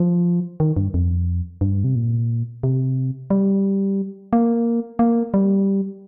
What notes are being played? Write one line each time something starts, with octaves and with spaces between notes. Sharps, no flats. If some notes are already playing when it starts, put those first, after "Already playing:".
Already playing: F3
D#3
G2
F2
G2
C3
A#2
C3
G3
A#3
A#3
G3